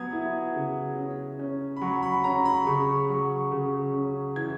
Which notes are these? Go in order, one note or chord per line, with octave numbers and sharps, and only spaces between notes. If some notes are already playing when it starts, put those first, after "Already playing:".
Already playing: F#3 B3 D#6 G#6
E4
C#3
C#4
C#4
B5
F#3 C#6
B5
C#4 A#5
B5
C#3 C#6
F#3
C#3
C#4
E3 G#6